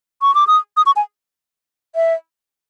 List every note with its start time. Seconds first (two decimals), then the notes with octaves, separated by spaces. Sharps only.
0.22 C#6
0.35 D6
0.47 D#6
0.77 D#6
0.86 C#6
0.96 G#5
1.96 E5